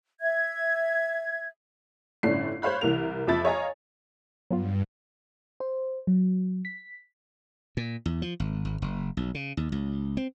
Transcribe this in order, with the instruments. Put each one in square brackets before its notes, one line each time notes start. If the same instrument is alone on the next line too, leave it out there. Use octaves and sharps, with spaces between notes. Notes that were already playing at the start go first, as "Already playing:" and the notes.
[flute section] E5 G#6
[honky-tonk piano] G1 A2 C#4 D4 C7
C5 C#5 F5 B5 F#6
C2 E3 A#4 F7
F2 F3 E5 B5 A6
C#5 D#5 F5 G#5 A#5
[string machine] G2 [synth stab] F#3 B3 F4
[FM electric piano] C5
F#3
B6
[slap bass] A#2
E2
F3
G#1
G#1
F#1
B1
C#3
D#2
C#2
C4